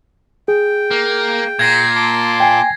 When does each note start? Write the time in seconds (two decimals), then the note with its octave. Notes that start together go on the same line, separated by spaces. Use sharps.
0.48 G#4 G5
0.91 A#3
1.59 A#2 G#6 A#6 C7
1.96 A5 C6 D6
2.40 G5 G#5